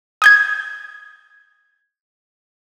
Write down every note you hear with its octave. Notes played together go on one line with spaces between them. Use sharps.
D#6 G6 G#6